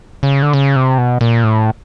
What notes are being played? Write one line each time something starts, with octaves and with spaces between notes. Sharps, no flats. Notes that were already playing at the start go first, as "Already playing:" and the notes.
C#3
D3
C#3
C3
B2
A#2
A2